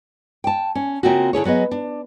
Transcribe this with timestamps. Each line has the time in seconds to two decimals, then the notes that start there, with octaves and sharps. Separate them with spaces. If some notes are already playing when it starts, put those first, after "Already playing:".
0.44 G5 A5
0.75 C#4
1.03 C#3 A#3 C4 F4 F#4
1.33 D3 E4 G#4 C#5
1.45 F#3 B3 G#4 D#5
1.71 D4